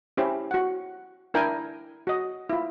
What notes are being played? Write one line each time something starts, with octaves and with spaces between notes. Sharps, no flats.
C#4 E4 G4 C5
F#4 F#5
D4 E4 A#4 G5 G#5
F#4 D#5
E4 F4